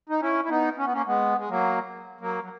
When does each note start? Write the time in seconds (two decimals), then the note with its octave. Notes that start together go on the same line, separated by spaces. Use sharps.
0.09 D#4
0.21 C#4 E4
0.45 E4
0.49 B3 D#4
0.78 C#4
0.86 B3
0.93 A#3 C#4
1.07 G#3 B3
1.38 G#3
1.49 F#3 A#3
2.20 F#3 A#3
2.44 F#3